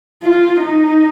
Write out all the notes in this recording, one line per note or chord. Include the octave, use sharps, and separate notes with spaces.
F4
D#4